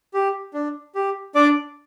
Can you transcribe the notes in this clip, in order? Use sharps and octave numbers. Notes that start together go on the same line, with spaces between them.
G4
D4
G4
D4 D5 D6